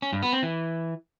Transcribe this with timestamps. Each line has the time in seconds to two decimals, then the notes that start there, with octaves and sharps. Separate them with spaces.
0.02 C#4
0.12 G2
0.23 B3
0.33 C4
0.43 E3